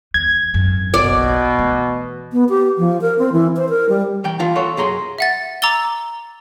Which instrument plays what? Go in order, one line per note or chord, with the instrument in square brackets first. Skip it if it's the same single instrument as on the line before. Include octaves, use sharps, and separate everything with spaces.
[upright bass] E2 [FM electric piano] G#6
[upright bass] G#1 F#2
[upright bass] F#1 B1 [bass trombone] B2 [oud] D5
[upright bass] E3 A3
[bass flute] B3
G4
F3
A#4
C4
E3
C5
A#4
G3
[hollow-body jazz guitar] E3 G5
E3 F4 A5
F4 F#4 A4 C#5
F#2 G#4 A#5 C6
[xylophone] E5 F#5 A6
A#5 D6 E6 A6 G7